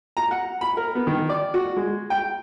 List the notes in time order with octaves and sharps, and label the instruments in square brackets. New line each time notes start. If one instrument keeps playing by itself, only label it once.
[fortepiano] A#5
F#5
B5
A#4
B3
D#3
D5
F#4
G#3
G5